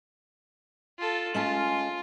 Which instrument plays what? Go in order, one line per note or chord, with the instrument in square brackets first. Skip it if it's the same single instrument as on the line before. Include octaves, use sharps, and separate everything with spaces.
[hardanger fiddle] F4 A4
[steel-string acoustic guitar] G#3 C#4 A5 [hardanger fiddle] F4